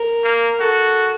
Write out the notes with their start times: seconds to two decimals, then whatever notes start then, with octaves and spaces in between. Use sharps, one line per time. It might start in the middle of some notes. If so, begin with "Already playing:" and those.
Already playing: A#4
0.24 A#3
0.60 F#4 A4